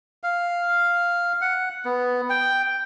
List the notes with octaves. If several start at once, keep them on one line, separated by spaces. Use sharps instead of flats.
F5
F#5
B3
G5